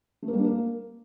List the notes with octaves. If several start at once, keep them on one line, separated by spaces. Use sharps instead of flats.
A3
A#3
G3
D4
A#3